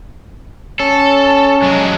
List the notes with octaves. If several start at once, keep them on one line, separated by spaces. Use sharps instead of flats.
C#4 A4
F#3 G#3